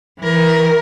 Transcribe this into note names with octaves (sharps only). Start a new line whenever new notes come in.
E3 A#4